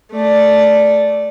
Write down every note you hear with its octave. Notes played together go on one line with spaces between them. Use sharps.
A3 D5